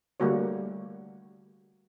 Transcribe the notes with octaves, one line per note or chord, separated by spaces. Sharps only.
D3 G3 A3 A#3 F#4 C#5